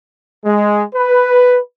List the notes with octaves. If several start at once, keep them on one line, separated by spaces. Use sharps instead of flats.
G#3
B4